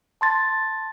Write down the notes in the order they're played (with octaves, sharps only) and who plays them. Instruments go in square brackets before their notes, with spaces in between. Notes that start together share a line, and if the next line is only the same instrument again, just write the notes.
[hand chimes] A5 C6 A6